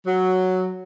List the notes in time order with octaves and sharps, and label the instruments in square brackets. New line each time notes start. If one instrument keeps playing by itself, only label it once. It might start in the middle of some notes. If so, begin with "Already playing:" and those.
[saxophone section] F#3